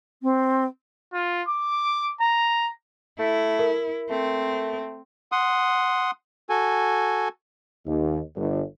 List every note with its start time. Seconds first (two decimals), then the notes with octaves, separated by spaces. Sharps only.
0.22 C4
1.13 F4
1.48 D6
2.20 A#5
3.19 A3 E4
3.59 A#4
4.10 A3 C4
5.32 F#5 C6 D#6
6.49 F#4 A4 G#5
7.86 D#2
8.36 G1